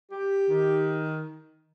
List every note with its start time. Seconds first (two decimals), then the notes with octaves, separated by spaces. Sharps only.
0.11 G4
0.49 D#3